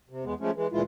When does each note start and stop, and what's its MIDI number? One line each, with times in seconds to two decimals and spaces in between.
0.09 0.24 48
0.24 0.34 40
0.24 0.34 56
0.24 0.34 59
0.40 0.51 53
0.40 0.51 56
0.40 0.51 57
0.40 0.51 61
0.55 0.67 52
0.55 0.67 56
0.72 0.82 38
0.72 0.82 46
0.72 0.82 52
0.72 0.82 56
0.72 0.82 64
0.72 0.82 65